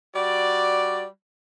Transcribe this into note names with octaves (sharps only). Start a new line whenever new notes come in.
G3 F#4 D5